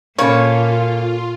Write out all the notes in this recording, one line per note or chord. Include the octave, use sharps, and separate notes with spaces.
A#2 A#3 C#4 F4 A4 C#5